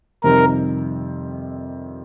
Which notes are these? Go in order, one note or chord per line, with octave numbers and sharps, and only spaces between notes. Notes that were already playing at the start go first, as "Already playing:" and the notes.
F2 C3 D#3 G3 C4 A#4